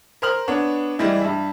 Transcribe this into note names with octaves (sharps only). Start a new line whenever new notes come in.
A#4 C5 F6 F#7
B3 D4 C#5
E3 G3 G#3 E4
G2 E5